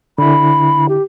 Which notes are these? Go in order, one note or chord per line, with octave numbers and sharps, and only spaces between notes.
D3 E4 B5
G4